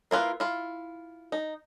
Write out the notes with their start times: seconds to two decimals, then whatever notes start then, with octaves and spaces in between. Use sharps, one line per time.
0.11 A#3 E4 F4 B4
0.40 E4 F4
1.32 D#4